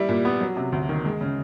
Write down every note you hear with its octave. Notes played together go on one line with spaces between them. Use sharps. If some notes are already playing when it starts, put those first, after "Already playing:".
Already playing: G3 E4
A#2
B3
F#3
C3
D2
D#3
G#3
C#3